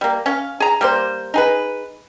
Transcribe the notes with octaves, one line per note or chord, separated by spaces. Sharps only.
G3 A#3
C#4 F5
G#4 A#5
G3 A#3 C5
D#4 G#4 B4